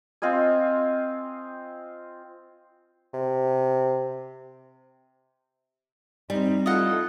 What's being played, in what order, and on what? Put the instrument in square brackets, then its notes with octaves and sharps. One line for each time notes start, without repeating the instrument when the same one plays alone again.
[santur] C4 F4 D#5 G#5
[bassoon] C3
[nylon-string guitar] G3 [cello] C4 D#4
[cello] E4 A4 [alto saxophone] F4 [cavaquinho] D#5 F#5